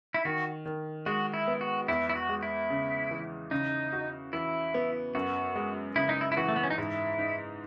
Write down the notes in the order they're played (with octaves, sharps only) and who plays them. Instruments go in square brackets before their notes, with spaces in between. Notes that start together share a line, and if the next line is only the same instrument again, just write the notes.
[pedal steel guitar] E4
[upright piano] D#3 [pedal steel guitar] F#4
[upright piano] D#3
[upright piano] G#3 [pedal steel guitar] F#4
[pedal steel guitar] E4
[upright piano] B3
[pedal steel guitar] F#4
[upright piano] E2 [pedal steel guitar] E4
[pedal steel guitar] E4
F#4
[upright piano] G#3
[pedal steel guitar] E4
[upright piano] C#3
E3
[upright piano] C#3 [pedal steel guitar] D#4
[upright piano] F#4
[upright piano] E3 [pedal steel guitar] E4
[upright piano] B3
[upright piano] F#2 [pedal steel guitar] F#4
[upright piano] G#3
[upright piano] C#3 [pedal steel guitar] E4
[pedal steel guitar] D#4
E4
E4
[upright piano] E3 [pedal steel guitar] F#4
[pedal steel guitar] A3
B3
C#4
D#4
[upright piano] G#2 [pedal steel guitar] E4
[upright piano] D#4